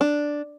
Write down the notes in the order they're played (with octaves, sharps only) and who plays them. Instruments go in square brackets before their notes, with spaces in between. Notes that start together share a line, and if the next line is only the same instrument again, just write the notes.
[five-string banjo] D4